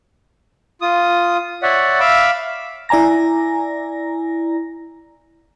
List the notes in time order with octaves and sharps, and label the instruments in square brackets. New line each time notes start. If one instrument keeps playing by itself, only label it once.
[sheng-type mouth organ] F4 D#6
C#5 D5 E5 F#5
E5 F5 B5 D6 E6
[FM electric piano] E4 D5 G#5 A#5 A#6